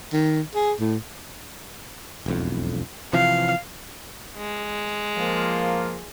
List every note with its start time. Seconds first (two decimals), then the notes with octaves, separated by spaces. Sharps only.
0.13 D#3
0.55 G#4
0.80 A2
2.26 E1 B1 F2
3.13 C3 E3 F3 F5
4.37 G#3
5.16 F3 A#3 F4